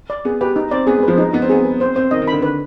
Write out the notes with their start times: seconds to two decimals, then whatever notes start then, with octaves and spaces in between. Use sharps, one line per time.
0.10 D5
0.25 B3 G#4
0.41 G4 B4
0.56 D#4
0.71 C4 D5
0.87 B3 G#4
0.98 G#3
1.03 F3 B4
1.18 G#3 D#4
1.33 B3 D#4
1.42 C4
1.50 B3 G#4
1.65 B4
1.80 C4 C5
1.96 C4 C5
2.11 D#3 D#5
2.22 D#3
2.28 B5
2.33 D3
2.42 B4